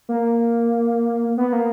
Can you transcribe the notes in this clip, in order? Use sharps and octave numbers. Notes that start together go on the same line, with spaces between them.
A#3
B3
A#3